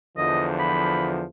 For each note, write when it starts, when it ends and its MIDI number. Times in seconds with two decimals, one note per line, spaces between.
0.17 1.23 40
0.17 1.23 50
0.17 1.23 53
0.17 0.46 75
0.59 1.10 83